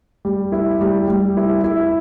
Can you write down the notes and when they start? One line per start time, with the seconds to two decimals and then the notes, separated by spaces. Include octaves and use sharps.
0.25 G3
0.52 E4
0.81 G3
1.08 G3
1.37 E4
1.64 E4